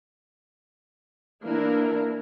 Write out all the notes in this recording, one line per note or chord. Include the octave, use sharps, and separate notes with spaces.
E3 A#3 D4 E4 A#4